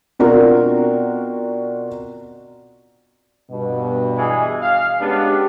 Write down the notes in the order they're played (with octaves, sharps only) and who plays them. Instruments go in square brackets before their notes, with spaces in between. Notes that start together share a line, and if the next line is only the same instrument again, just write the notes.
[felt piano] B2 C4 D4 F4 F#4 A#4
[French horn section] G2 B2
[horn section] E3 G#3 G#4
F5
[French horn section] G#3 C#4 G4 [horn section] B3 D4